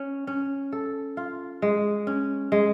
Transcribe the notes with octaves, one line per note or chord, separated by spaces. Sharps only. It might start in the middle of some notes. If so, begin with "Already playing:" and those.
Already playing: C#4
C#4
A4
F4
G#3
C#4
G#3